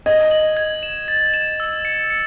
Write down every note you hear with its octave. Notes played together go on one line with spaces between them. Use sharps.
D#5 G#6
F#7
G#6
E7
A6
E7
E6
C#7
C#7